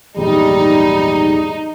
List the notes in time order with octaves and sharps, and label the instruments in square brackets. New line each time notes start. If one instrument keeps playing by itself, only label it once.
[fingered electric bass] A#1 E2 G#2 [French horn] G3 [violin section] D#4 [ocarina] G#4